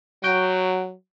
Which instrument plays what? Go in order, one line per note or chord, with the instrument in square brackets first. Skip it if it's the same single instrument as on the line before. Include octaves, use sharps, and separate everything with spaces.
[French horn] F#3 [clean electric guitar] F#4 G5